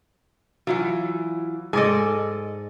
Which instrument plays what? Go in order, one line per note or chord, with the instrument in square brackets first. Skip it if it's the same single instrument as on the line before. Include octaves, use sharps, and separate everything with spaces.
[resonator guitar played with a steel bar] E3 E4 F4 [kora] F#3
[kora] G#2 D5 D#5 [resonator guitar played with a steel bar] A4 G#5